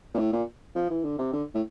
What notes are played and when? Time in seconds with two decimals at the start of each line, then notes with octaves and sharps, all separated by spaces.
0.14 A#2
0.18 A2
0.33 A#2
0.75 F3
0.90 E3
1.04 D3
1.19 C3
1.33 D3
1.55 A2